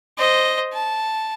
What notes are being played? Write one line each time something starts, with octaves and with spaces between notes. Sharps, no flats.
C5 D#5
A5